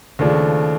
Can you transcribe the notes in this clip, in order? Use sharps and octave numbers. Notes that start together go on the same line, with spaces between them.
D#2 C#3 F3 A3 D4